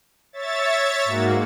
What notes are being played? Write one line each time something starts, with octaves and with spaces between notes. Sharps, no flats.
C#5 E5 A6
G#2 A#3 F#4